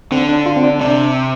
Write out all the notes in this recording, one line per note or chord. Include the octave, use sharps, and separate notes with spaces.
D3 C4
D4
F4
C4
D4
C3 D4